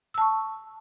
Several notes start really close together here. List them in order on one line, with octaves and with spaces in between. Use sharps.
E6 A5 C#6